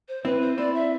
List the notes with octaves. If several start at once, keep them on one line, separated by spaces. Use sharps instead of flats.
C5
C4 E4 B4
C5
C4 E4 D5
E5